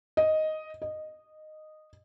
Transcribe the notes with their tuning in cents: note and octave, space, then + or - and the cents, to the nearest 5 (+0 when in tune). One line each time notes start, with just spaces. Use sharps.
D#5 +5
D#5 -10